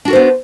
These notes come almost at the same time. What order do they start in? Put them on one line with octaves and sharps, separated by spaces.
D4 F#4 A#4 C5 B3